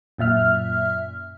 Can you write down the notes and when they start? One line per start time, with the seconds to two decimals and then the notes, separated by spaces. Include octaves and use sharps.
0.18 F#2 A#2 E5 F6